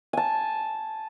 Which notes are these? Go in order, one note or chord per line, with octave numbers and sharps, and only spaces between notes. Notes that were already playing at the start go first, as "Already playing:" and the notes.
G#5 A5